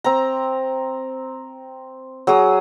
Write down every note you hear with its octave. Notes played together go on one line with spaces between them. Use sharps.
C4 A#5
F#3 G#4 D#6